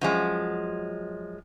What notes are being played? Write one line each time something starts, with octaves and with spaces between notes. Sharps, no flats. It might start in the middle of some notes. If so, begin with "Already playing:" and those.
F#2 F3 G#3